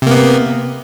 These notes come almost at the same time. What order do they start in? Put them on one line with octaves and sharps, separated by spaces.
C3 A#3 B3